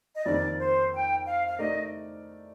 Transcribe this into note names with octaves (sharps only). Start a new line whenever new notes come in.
D#5
F2 D#3 A#3 D5
C5
G5
F5
F5
A3 D#4 A#4 D5 D#5